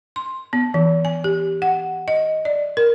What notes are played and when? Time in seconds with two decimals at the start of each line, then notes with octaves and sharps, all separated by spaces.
0.16 C6
0.53 B3
0.74 E3
1.05 G#5
1.24 G4
1.62 F#5
2.08 D#5
2.45 D5
2.77 A#4